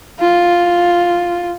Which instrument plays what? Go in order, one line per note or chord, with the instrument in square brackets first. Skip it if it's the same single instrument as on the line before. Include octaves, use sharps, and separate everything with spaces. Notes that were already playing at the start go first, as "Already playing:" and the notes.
[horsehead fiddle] F4